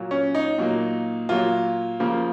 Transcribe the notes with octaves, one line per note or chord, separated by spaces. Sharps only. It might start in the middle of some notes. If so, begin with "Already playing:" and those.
Already playing: A#2 F#3 A#3
C#4
D#4
A#2 F#3 A#3
A#2 F#3 A#3 F4
C#3 F3 A#3